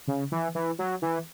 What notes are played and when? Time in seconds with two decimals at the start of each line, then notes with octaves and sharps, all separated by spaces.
0.08 C#3
0.32 E3
0.55 E3
0.79 F#3
1.02 E3